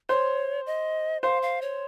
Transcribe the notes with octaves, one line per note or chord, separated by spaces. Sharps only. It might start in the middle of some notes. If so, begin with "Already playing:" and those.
C5 C#5
D#5
C5 F5
F5
C#5